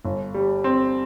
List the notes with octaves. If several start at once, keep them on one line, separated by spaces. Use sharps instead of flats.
G1
G3
C4